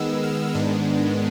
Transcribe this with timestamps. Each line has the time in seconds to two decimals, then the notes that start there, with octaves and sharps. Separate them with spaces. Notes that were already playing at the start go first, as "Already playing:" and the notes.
Already playing: D#3 G#3 B3 E6
0.23 F6
0.55 G#2 D#3 G#3 B3 D4